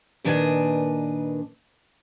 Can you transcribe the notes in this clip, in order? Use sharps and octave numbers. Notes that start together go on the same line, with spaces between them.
A#2 D#3 D4 B4 D#5 G#5